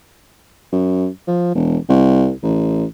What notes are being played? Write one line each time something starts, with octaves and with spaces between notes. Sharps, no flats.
F#2
F3
E1
C2
A1